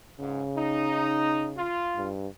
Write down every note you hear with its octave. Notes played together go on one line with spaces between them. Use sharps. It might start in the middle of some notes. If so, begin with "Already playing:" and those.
C#2 G#2 C#3
D#4
F4
G2